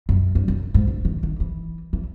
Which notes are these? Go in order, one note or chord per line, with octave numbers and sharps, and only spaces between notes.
F#2
G2
F#2
G#2
D3
D#3
D#3
E3
E3